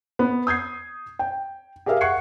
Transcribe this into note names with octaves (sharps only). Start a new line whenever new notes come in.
B3
D#6 G6 G#6 C7
G5
G4 G#4 A#4 E5 F5
F#5 C#6 F#6 G#6 C7 C#7